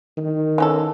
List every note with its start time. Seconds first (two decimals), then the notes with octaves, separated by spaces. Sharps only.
0.17 D#3
0.58 E3 C#4 A4